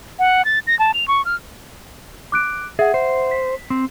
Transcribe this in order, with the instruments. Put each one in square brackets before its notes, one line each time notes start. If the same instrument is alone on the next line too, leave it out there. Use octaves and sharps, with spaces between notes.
[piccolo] F#5
A6
A#6
A5
F7
C#6
F6
[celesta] D6 F#6 D7
[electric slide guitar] G#4 [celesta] E5 F#5
[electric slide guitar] C5
[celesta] B6
[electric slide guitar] C4